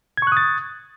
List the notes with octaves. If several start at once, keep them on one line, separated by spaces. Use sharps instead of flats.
C#6 D#6 F#6 G#6 A6